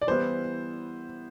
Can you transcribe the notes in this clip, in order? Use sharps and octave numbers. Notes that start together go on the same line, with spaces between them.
D5
E3 G3 B3 E4 C5